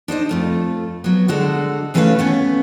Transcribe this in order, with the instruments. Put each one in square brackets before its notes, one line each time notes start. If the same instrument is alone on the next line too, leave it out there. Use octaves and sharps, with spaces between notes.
[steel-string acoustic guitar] D4 D#4 C5 D#5
F2 A3 F4
F#3 B3
D3 G#3 F#4 A4
D#2 E3 A3 C#4 B4 F5
A3 B3 C#4